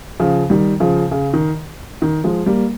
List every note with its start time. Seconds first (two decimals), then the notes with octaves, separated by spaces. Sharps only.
0.20 C#3 F3
0.50 D#3 G3
0.80 C#3 F3
1.11 C#3
1.33 D#3
2.02 D#3
2.24 F3 G#3
2.46 G3 A#3